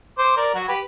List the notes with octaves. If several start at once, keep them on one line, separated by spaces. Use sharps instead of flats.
C5 D6
A#4 D5
F#3 F#4
G4 B4 B5